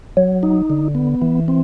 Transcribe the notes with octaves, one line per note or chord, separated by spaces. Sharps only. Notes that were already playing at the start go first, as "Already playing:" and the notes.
F#3
D#4
D3
B3
E3
C4